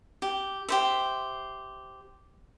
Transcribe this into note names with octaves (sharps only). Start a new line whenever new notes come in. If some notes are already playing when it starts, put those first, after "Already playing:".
G4
G4 C5 E5